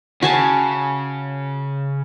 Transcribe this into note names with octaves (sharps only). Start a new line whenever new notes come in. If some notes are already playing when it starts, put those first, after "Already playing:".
C#3 F#4 G#5 A5